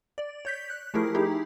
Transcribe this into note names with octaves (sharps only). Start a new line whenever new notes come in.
D5
C#5 G6 B6
F#6
F3 A3 E4 G4 G#4 A#4
D#4 E4 G4 G#4 A#4